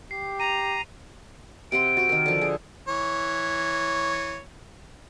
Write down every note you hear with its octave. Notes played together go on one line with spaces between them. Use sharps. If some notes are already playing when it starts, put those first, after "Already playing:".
G4 C7
A#5 D#7 F7
C3 F#5 C6 D7
F#4 C5
D#3 A#4
D3 F3
G#4
E3 C#5